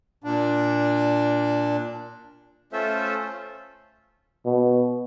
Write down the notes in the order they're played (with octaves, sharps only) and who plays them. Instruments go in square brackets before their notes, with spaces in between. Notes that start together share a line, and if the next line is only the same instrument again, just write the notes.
[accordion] A#2 D4
[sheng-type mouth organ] A3 C#4 F4 A4 C5 E5
[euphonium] B2